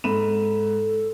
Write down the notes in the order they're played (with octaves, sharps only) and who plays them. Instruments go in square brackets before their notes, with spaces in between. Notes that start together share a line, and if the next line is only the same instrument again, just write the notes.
[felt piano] G#2 B5 E7 [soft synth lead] A4